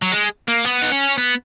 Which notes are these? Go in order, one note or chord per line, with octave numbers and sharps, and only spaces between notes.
F#3
G#3
A#3
B3
D#4
C#4
B3